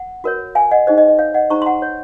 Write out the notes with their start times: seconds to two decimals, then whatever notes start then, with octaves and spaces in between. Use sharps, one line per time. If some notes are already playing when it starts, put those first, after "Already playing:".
Already playing: F#5
0.24 F#4 A#4 C#5
0.55 F5 G#5
0.71 D#5 F#5
0.87 D#4 G#4 C5 D#5
0.98 D#5
1.08 D#5
1.18 C#5 F5
1.34 D#5 F#5
1.50 D#4 G#4 C5 A#5 C#6
1.62 C6
1.66 F#5 A#5
1.82 C#5